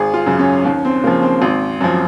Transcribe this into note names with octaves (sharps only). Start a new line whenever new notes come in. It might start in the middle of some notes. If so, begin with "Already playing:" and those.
Already playing: G#1 G#4
F4
F#2 C#3
C#4
D#2 C#4
C4
C#3 F3 A#3
C4
G#1 C4
F#2 F3